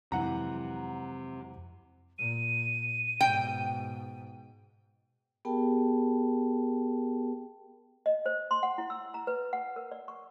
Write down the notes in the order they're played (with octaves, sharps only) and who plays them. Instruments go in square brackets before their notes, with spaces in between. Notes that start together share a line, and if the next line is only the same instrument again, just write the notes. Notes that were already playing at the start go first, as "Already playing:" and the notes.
[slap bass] F2 F#3 G#3 [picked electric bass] C3 [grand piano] E3 F#5 A#5
[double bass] A#2 [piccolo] D#7
[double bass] G#2 B2 [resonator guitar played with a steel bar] G5
[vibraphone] B3 G4 G#4 A#4 G5 A5
[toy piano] D#5
C5
C6
F#5
E4
E6
A#5
B4
F#5
A#4
D5
C#6